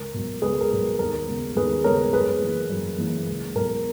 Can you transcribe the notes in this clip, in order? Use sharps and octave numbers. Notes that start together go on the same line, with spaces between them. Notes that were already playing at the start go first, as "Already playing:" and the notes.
Already playing: C#2 A#4
B2 F#3
C#2 G#4 B4
A#4
B2 F#3
D#2 A#4
C#3 G#3 B3
D#2 G#4 B4
C#3 G#3 B3 A#4 C#5
F#2 G#4 B4
E3 A#3
F#2
E3 A#3
C#2
B2 F#3 A#4